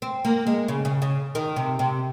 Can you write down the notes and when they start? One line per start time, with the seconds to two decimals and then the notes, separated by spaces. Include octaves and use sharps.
0.02 C4
0.25 A#3
0.47 G#3
0.68 C#3
0.85 C#3
1.02 C#3
1.35 D#3
1.56 C3
1.79 C3